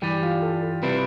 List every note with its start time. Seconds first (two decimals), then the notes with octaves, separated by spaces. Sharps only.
0.02 G2 E3 G3 G4
0.23 F4
0.42 A4
0.62 A4
0.83 C3 G3 C4 E4 B4